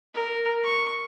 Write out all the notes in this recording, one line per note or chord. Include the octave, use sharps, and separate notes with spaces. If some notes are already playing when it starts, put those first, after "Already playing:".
A#4
C#6